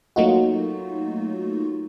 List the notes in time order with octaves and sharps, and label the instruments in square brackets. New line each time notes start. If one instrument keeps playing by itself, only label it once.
[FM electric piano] F#3 A3 A#3 D#4 F4 F#4